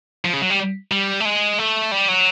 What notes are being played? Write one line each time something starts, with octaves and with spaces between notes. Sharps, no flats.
F3
C#3
F#3
G3
G3
A3
G#3
A3
G3
F#3